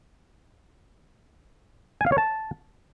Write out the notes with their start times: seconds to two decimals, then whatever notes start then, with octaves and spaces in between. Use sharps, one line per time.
2.01 G#5
2.06 F5
2.12 C#5
2.18 A5